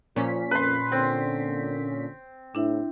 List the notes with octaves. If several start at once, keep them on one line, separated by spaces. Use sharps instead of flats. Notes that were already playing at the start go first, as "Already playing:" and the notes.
A#2 F3 C#4 B6
F2 B4 C6
D3 C4
A2 D4 E4 E5